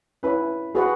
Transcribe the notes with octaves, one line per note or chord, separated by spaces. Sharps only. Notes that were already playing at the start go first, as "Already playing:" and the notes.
C#4 E4 B4 C#5
F#4 G#4 B4 F#5